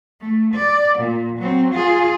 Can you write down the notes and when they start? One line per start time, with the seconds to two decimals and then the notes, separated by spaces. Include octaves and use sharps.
0.21 A3
0.54 D5
0.99 A#2
1.38 F#3 C4
1.73 F4 G#4